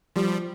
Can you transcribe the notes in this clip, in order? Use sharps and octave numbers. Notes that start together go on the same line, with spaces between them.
F3 G3